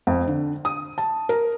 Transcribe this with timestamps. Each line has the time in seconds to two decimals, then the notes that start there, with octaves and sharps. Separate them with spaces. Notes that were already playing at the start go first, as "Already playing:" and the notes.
0.07 F2
0.28 D3
0.65 D#6
0.98 A5
1.29 A#4